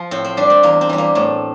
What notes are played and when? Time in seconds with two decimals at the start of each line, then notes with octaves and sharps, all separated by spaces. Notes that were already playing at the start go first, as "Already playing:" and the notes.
Already playing: F3 F4
0.11 A2 C4
0.24 C4
0.37 G3 D4
0.50 C4
0.63 E2 A#3
0.81 C4
0.89 E3 G3
0.98 A#3
1.15 A2 A3